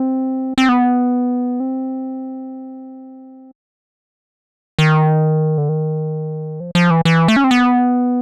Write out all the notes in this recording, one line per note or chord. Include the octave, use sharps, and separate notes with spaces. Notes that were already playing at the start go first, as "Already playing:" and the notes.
Already playing: C4
C4
B3
C4
D#3
D3
D#3
F3
F3
E3
E3
A3
C#4
C4
B3